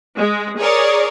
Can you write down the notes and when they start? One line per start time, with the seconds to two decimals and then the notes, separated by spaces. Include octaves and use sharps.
0.20 G#3
0.60 G#4 A#4 C#5 D5